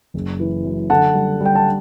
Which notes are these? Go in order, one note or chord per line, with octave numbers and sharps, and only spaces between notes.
F#1
E3
F#2
D3 F#5 A5
G3
G3 G5
A5